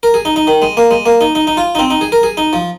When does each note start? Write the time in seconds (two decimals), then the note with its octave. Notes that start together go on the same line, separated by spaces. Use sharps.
0.03 A#4
0.14 G#4
0.25 D#4
0.36 D#4
0.47 D#3
0.62 G#3
0.77 A#3
0.91 G#3
1.06 A#3
1.21 D#4
1.35 D#4
1.47 D#4
1.57 F4
1.75 D#4
1.79 C4
1.90 D#4
2.01 G#4
2.12 A#4
2.23 G#4
2.37 D#4
2.53 F3